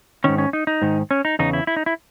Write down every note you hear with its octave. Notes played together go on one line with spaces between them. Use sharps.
G#2 D#3 C#4
C#4
D#4
D#4
G#2 D#3
C#4
D#4
E2 C#3 D#4
E4
E4
D#4
E4